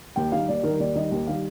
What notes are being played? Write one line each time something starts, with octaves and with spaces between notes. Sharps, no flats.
D#2 G5
D#3 G3 F5
D#2 D5
D#3 A#4
G3
D#2 D5
D#3 G3 D#5
D#2
D#3 G3 F5